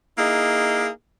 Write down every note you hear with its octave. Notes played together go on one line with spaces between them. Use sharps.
A#3 D#4 E4 G#4